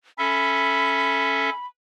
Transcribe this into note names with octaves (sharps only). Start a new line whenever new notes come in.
C#4 A4 E5 B5